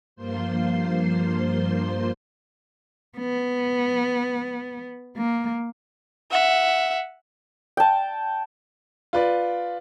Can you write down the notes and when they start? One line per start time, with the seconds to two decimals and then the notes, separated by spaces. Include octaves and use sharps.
0.16 G2 F3 A#3 F4 C5 C6
3.19 B3
5.17 A#3
6.31 E5 F#5
7.77 G5 A5
9.13 F4 B4 D5